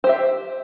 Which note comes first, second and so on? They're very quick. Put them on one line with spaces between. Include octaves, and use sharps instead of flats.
C5 G4 E5